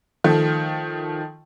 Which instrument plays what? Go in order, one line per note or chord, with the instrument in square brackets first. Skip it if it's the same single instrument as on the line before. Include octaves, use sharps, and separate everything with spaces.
[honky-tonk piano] D#3 F3 A3